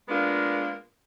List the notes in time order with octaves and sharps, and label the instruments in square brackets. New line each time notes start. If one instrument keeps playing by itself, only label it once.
[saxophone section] G#3 A#3 B3 D4 F4